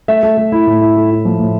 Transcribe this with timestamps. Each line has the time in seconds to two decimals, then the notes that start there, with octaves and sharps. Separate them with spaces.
0.08 A3 E5
0.23 A3
0.37 A3
0.52 E4
0.67 A2
0.81 E4
0.96 A3
1.11 E4
1.25 F3
1.39 A2